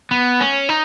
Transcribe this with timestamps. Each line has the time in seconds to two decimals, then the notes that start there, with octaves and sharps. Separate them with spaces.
0.11 B3
0.40 C#4
0.69 D#4